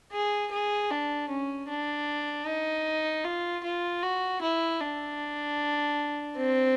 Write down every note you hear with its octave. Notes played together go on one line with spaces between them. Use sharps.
G#4
G#4
D4
C#4
D4
D#4
F4
F4
F#4
E4
D4
C4